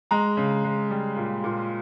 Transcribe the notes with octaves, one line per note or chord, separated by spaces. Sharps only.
G#3 A#5
C#3
G#3
G3
A#2
A#2